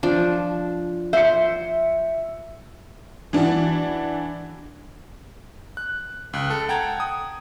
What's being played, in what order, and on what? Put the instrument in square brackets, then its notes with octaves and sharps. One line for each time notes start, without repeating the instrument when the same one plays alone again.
[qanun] F3 D4
[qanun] C5 [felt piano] E5 C#7
[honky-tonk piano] E3 D4 E4 F#4
[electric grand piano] F#6
C#2 F#6
A4
F#5 G5 A5 A#5 G#6
D#6